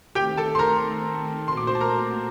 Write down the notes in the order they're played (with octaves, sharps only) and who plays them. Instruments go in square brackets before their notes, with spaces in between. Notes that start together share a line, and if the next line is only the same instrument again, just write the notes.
[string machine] D#3 A3 C4 [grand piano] G4 G5
[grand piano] A4 A5
C6
A#4 A#5
[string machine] A#2 A3 C4 F#4 [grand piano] C6
[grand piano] D6
C5 C6
A5
A#4 A#5